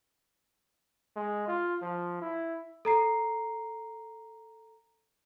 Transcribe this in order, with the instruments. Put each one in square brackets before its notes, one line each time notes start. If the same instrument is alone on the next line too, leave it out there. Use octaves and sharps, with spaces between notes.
[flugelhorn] G#3
F4
F3
E4
[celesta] A4 A#5 C7